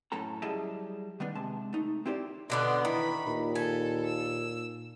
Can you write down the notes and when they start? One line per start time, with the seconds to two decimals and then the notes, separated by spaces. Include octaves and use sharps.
0.12 F#2 A2 C#4 A4 A#5
0.43 F#3 G3 E4 G#4 D#5 A5
1.20 D#3 G3 B3 D4
1.35 C3 G#3 A5
1.73 A3 D#4
2.06 C4 E4 G4 C5 D5
2.50 B2 D3 B3 D5 C6
2.85 D#3 E3 B5
3.26 D#2 A#2
3.55 A4 G#5
4.05 E6